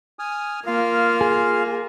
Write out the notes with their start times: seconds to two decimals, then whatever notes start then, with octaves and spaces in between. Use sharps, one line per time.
0.19 G#5 D#6 F6
0.66 A#3 F4 F5 F6
1.21 G#4